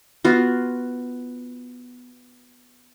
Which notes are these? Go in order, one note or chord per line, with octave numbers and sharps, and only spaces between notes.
B3 F4 F#4